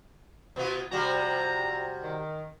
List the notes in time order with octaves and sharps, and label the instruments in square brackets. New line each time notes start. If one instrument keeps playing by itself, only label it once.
[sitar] B2 B3 F4
[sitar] C3 G3 F#4 [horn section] F3 C4 A#5
[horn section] D#3